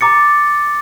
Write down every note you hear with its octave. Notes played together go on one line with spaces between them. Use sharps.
A#5 D6 A6 C#7